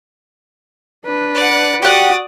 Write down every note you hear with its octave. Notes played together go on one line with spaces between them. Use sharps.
D4 B4
D5 F#5
F#4 G4 D5 F#5 D#6